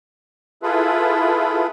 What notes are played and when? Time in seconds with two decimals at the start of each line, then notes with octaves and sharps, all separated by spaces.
0.63 E4 F4 G#4 A4 B4